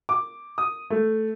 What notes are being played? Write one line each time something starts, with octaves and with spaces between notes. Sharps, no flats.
D6
D#6
A3